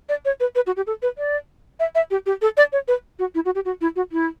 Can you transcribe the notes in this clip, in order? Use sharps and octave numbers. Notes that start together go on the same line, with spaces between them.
D5
C#5
B4
B4
F#4
G4
A4
B4
D5
E5
E5
G4
G4
A4
D5
C#5
B4
F#4
E4
F#4
G4
F#4
E4
F#4
E4